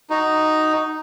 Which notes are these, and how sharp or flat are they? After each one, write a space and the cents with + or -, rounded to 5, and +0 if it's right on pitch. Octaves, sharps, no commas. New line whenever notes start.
D#4 +0 F#4 +10